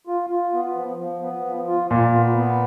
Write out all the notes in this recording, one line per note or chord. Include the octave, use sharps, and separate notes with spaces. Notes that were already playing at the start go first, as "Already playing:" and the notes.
F4
F4
B3
F3
F3
B3
F3
F4
A#2 F4
B3
B3